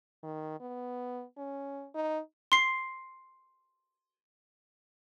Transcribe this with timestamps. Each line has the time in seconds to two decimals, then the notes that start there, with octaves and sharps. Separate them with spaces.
0.23 D#3
0.60 B3
1.37 C#4
1.95 D#4
2.52 C6 C7